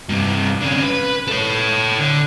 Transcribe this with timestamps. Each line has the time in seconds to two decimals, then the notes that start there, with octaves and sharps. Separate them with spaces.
0.09 G2 C3
0.61 D3 C#4
0.82 B4
1.28 A4 C#5
1.99 D3